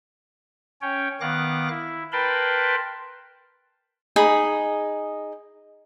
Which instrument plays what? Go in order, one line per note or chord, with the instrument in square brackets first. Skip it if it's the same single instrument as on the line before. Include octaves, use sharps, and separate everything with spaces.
[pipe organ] C#4 C#5 G5
D#3 B3 F5 D6 F#6 A#6
E4
A#4 B4 G5 A5 B5 C6
[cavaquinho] D#4 G#4 D#5 B5